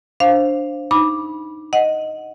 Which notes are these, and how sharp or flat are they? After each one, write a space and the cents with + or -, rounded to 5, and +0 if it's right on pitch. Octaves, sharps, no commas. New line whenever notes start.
D4 +0 C5 +10 F5 +0
D#4 +0 B5 -15 D6 +0
D#5 +0 F#5 +0